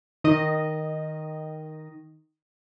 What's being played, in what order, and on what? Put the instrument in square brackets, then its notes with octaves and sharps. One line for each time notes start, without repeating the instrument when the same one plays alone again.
[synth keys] D#3 D#5